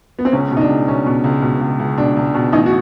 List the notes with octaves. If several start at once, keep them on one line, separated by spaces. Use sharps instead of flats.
B3
C4
C#2 C#4
B2
D#4
D4
C#2
B2 C#4
B2
C#2
B2
C#2
C#2
B2 D4
C#2
B2
A1 D#4
F#4